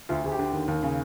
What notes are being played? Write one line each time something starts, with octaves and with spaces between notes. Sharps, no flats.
D2 F4
D2 G#4
G4
D3
D#2
D#2
C#3